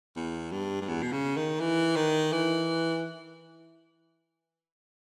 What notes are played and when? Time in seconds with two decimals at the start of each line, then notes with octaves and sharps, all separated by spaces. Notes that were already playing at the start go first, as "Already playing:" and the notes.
0.16 E2
0.52 G2
0.81 G2
0.88 E2
1.02 B2
1.12 C#3
1.37 D#3
1.60 E3
1.96 D#3
2.32 E3